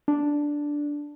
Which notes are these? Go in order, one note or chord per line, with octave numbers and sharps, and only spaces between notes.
D4